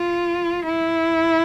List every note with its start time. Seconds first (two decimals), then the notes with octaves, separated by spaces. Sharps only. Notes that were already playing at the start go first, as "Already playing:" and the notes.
Already playing: F4
0.66 E4